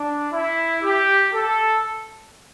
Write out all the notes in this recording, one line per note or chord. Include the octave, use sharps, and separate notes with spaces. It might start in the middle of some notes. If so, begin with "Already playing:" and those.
Already playing: D4
E4
G4
A4